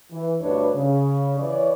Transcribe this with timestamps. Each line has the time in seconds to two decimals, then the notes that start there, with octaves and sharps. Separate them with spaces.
0.12 E3
0.41 D2 G2 D4 B4 C#5
0.75 C#3
1.39 E3 C#5 D5